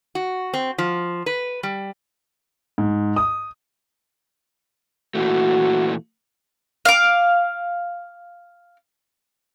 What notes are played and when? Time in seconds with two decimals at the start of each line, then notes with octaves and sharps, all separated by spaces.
0.15 F#4
0.54 C4
0.78 F3
1.26 B4
1.63 G3
2.78 G#2
3.16 D#6
5.15 A#2 E3 A3 F#4
6.85 F5 D6